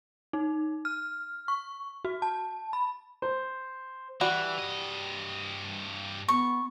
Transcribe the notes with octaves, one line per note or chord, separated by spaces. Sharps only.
D#4
F6
C#6
F#4
A5
B5
C5
E3 G3 F#4
G2 D#5
B3 C#6